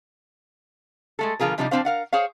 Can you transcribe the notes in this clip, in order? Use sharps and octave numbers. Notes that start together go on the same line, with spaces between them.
G#3 A3 A4
B2 D3 F3 F4 G#4 A#4
C3 F3 G3 C4 D4 D#4
F3 G#3 C4 D4 C5 F5
A#4 F5 F#5
G#4 C5 C#5 F5